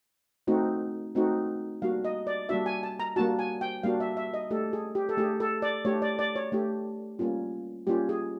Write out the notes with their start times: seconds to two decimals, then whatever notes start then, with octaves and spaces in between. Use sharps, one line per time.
0.47 A3 C4 D#4 F#4
1.15 A3 C4 D#4 F#4
1.82 G3 A#3 D4 F#4 F5
2.04 D#5
2.27 D5
2.49 G3 A#3 D4 F#4 E5
2.66 G#5
2.83 A5
3.00 A#5
3.16 G3 A#3 D4 F#4 A5
3.39 G#5
3.61 G5
3.83 G3 A#3 D4 F#4 F5
4.00 E5
4.17 E5
4.34 D#5
4.51 A3 D4 G4 A4
4.73 G#4
4.95 G4
5.09 A4
5.17 A3 D4 G4 G#4
5.40 A4
5.62 D5
5.85 A3 D4 G4 C#5
6.02 D5
6.19 D5
6.36 C#5
6.52 A3 D4 G4
7.19 G3 A#3 C#4 F4
7.87 G3 A#3 C#4 F4 G4
8.09 G#4